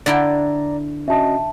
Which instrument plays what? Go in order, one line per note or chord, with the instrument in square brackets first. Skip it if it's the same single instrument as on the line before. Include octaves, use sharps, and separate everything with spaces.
[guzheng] D3 E4 G5 [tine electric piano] D5 A#5
[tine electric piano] C#4 F#4 D#5 [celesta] E5 A5